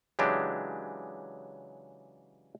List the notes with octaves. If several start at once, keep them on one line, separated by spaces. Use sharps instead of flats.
C#3 E3 F#3 G#3 D4 G4